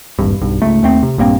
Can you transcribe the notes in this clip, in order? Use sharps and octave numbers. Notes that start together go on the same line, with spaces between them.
D#1 G#1 G2
B1 G2
C#2 G#2 A3
D#2 A3 C4
C3
A#1 G2 A#3 C4